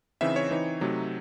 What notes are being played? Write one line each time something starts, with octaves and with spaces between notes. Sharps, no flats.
C#3 E3 C4 D#4 E5
C#5
E3 C4 D#4
C3 F#3 A3 D#4